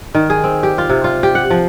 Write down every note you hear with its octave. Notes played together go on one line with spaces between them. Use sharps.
D#3
G#4
C4
G4
F4
C3
F4
G4
F#5
F3